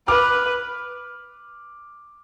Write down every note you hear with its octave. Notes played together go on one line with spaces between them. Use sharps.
B4 D6 F6